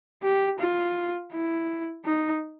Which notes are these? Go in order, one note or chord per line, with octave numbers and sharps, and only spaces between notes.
G4
F4
E4
D#4